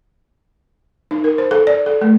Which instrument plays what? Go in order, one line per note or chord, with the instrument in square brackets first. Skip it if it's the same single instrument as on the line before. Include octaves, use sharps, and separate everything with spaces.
[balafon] D#4
A#4
C5
A4
D5
A4
A3